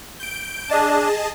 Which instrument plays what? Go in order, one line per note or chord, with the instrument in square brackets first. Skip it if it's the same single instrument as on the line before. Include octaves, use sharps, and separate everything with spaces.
[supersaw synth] G6 D7
[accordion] D4 [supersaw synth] G#4 D#5 A5